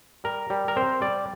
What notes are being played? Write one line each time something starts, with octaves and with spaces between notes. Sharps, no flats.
G3 A#4
G3
A#4
C4 C5
G3 D5